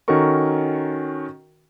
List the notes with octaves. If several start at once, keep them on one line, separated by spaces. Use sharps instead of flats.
D#3 C#4 F#4 A4 A#4 C#6